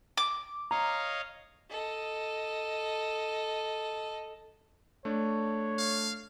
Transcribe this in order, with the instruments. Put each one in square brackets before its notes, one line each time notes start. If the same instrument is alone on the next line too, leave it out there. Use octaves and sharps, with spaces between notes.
[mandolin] D6
[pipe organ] C#5 D#5 F5 [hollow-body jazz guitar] A#5
[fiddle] A4 D#5
[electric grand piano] A3 D4 [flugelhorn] C#5
[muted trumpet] F5